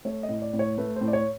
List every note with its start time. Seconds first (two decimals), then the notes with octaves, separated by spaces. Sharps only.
0.05 A3 C#5
0.23 D#5
0.29 A2
0.42 D5
0.53 A2
0.59 C#5
0.78 A3 B4
0.96 C5
1.01 A2
1.08 D5
1.13 C#5